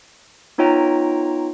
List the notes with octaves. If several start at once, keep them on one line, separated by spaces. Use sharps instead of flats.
B3 D#4 F4 C#5 G5 A#5